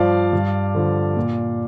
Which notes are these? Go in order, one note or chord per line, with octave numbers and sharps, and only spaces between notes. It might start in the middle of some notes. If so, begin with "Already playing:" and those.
Already playing: G2 F3 D5 F5
G2
D3 F3
A#2